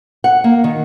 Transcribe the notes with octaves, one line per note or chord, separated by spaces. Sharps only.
F#5
A#3
D#3